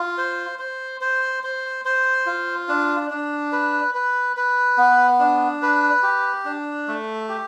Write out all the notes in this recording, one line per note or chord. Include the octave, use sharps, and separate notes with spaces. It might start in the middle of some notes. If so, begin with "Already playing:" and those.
Already playing: F4
C5
C5
C5
C5
C5
F4
D4
D4
B4
B4
B4
B3
D4
B4
G4
D4
A3
G4